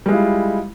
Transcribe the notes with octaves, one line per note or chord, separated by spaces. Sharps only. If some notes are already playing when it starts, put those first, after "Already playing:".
G3 G#3 E4 F4